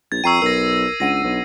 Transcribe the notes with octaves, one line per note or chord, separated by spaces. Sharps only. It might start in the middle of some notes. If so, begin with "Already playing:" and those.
A#1 G#6 A6
F2 G5 A#5 C#6 E6 C7 D#7
B1 A#4 E6 A#6
C#2 D4 F#5 A#6 D#7
B1